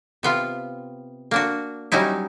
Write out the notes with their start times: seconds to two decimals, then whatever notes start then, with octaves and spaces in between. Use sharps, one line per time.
0.23 C3 B3 F4
1.31 A#3 D4 F#4
1.92 F#3 G3 C#4 D#4 E4